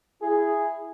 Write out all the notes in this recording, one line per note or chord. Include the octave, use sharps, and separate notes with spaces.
E4 G#4